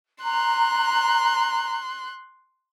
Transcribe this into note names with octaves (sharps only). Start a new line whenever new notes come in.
A#5 C6 F#6